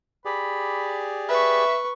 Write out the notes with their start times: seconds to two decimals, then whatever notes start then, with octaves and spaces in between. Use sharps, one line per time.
0.25 G4 G#4 D5 B5
1.29 B4 E5 C#6